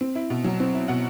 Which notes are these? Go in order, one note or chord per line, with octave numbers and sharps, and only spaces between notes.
C4
E4
B2
F#3
C4
E4
B2 F#5